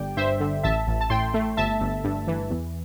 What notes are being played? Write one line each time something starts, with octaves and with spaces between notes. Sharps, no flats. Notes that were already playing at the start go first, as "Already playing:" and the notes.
Already playing: G1 G3 D4 D5 G5
G2 C5 E5
D3
A1 E5 A5
A1
A5
A2 G5 C6
A3
G1 E5 A5
G1
G2
E3
E2